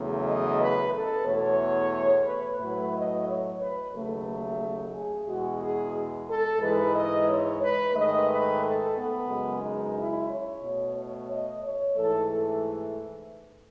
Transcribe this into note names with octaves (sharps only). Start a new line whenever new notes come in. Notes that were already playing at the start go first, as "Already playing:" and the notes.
Already playing: E2 C#3 F#3 A3
D#5
B4
A4
E2 B2 A3 C#5
B4
A2 F#3 A3 B4
D#5
C#5
B4
D#2 C#3 F#3 A3
G#4
E2 B2 G#3 F#4
G#4
A4
G#2 E3 G#3 B4
D#5
C#5
B4
G#2 D#3 A3 D#5
B4
A4
B3
F#2 C#3 G#3
D#4
E4
C#5
B2 A3
C#5
D#5
C#5
G#2 E3 A3 A4